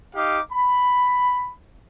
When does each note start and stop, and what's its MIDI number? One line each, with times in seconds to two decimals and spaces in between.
0.15 0.40 63
0.15 0.40 67
0.15 0.40 77
0.15 0.40 86
0.52 1.50 83